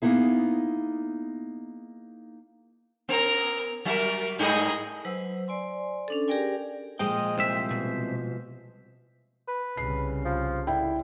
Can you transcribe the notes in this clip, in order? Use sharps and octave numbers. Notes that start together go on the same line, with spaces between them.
A#3 B3 D#4 E4 G#4
B3 A#4 A#5
F#3 A#4 E5
G#2 G3 D#4 G#4 D#5
F#3 B4 C5 F#5 E6
C5 D5 G#5 C6
C#4 D4 A4
G4 G#4 A#4 D5 G5 G#5
A#2 F3 G#3 D#5 G5
C2 C5 E5
B2
B4
C2 C#3 C7
F3
D3 E4 G5